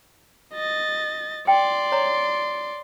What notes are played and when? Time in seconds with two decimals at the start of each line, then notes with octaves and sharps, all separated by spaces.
0.54 D#5 A6
1.47 D5 G5 C6
1.92 C#5 A#5